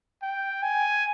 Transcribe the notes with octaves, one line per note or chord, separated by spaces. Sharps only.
G5
G#5